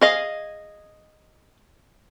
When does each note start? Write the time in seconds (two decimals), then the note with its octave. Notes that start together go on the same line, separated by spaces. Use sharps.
0.01 G#4 D#5 F5